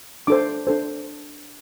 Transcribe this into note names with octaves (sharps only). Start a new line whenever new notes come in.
D4 A4 C5 D6
D4 A4 C5